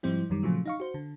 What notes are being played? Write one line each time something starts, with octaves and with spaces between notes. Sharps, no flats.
G#2 F3 G3 C4 E4
F#2 D#3 G3
A#2 C#3 F3 F#3 A3
D#4 F5 C#6
F#4 C5
D3